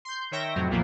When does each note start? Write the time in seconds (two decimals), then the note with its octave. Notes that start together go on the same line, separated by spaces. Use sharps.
0.05 C6 G6
0.31 D#3 C#5 E5 G5 A#6
0.55 F2 A2 C3 F#3 C4
0.69 B1 A#2 E3 F3 A#3